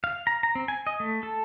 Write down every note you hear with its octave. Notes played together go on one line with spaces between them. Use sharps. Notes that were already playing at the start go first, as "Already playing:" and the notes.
F5
A#5
A#5
C4
G#5
D#5
A3
A4